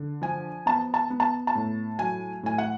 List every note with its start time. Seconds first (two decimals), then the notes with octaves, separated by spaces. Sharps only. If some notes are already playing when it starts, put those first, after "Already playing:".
Already playing: D3
0.22 F3 G#5
0.66 B3 A5
0.94 A5
1.10 B3
1.20 A5
1.47 A5
1.55 A2
1.99 F#3 G#5
2.43 A2 G#5
2.58 F#5